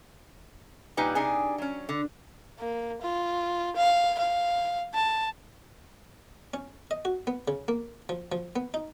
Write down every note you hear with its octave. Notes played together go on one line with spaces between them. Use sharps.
A#2 G3 D#4 B4 G#5
C3 D4 D#4 G#4 G#5
F#3 C#4
D3
A#3
F4
F5
F5
A5
C#4
D#5
F#4
B3
C#3
A#3
F3
F3
B3
D#4